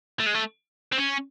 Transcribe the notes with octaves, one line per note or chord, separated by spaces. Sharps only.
A3
G#3
A3
C4
C#4